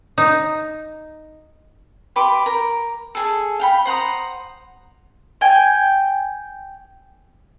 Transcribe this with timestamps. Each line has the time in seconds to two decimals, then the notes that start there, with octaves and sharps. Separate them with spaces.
0.18 D#4
2.16 G4 B4 C6 D6
2.46 A#4
3.15 G#4 A4
3.59 F5 G5 B5
3.85 C5 F#5 A#5 D#6
5.41 G5 G#5